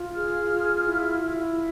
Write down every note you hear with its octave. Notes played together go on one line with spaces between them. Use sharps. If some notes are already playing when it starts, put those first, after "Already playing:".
Already playing: F4
G#4 F6
F4
E4
E4